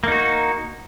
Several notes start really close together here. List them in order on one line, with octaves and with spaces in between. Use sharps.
A#3 D#4 F#4